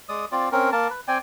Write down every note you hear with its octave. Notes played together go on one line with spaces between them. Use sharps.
G#3 D5 D#6
C4 F4 D5
C4 C#4 A#4
A#3 A#4 A5
B4
C4 D5 G5 G#5